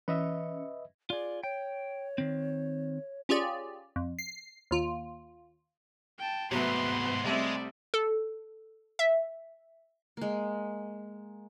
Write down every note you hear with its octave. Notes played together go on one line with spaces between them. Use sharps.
E3 C#4 B4 D#5 E5
F4 G#4 D5
C#5 G5
D#3 C4
C#4 F4 G4 G#4 D5
F2
C7
D#2 F4
G5 A5
G#2 C3 F#3 A3 B3 B4 C6
C2 G#3 A3 C4 D5 E5
A4
E5
G#3 A#3